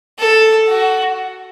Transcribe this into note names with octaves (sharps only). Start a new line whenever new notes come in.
A4
F#4